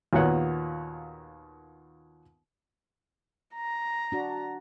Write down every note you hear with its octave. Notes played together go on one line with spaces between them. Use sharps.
D#2 A#2 B3 F#4 C#5 F#5
A#5
D4 F#4